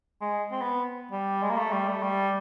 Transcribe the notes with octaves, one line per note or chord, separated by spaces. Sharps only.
G#3
C4
B3
G3
G#3
A#3
A3
G3
A3
G3